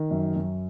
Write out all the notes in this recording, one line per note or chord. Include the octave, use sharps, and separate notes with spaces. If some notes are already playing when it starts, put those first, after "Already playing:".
Already playing: D#3
F#2
F#2